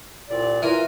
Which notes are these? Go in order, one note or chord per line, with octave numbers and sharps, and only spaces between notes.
C2 A#2 D5
E3 F4 A#4 G#5